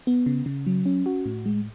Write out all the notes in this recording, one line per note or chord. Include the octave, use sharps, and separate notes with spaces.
B3
C#3
C#3
F#3
C#4
F#4
A2
G#3